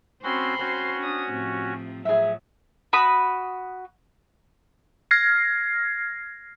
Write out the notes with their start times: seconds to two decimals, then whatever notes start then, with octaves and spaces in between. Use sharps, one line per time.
0.24 C4 C#4 F#4 C5 B5 C6
0.59 C4 C#4 F#4
1.00 D4 D#6
1.31 A2 C3 F3
2.05 A2 F3 F#3 G#4 E5
2.93 F#4 B5 D#6
5.11 F6 G#6 A#6 C7